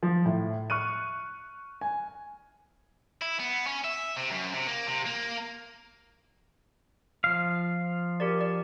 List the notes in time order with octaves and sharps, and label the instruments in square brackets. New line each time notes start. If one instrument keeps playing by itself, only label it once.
[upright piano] F3
A2
C#6 F6 F#6 D#7
G#5
[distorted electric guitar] E4
B3
C#4
E5
C3
F#2
C3
A#3
C3
A#3
[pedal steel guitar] F3 F5
[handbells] G4 A#4 D5
D5